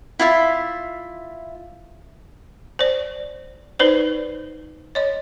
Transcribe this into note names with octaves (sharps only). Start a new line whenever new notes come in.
E4 F4 E5
C5 D5
D#4 B4 C5 D5
C#5 D#5